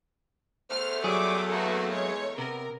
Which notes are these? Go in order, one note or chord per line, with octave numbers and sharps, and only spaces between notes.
E2 A3 C5 F6
F#3 G3 G#4 E5 D6
A#3 B3 F#4 A4
G#3 C#5
C3 B3 A#4